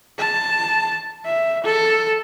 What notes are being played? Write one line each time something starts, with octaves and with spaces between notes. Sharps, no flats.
A5
E5
A4